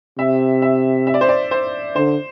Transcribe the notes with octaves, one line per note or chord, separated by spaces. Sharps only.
C3 E5
E5
E5
D5
C5
D5
C5
D3 C5